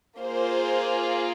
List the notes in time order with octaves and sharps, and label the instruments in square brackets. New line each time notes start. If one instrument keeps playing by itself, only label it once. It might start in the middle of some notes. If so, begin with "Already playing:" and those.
[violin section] A#3 F4 G#4 C5